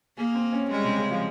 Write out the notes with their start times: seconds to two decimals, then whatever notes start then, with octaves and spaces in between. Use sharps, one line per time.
0.17 A#3 G#4
0.35 C4
0.53 C#4
0.71 G3 G#3
0.84 C3
0.97 C#3
1.10 F3